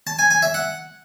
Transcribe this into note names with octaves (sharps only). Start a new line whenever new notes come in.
A5
G#5
G#5
E5
F#5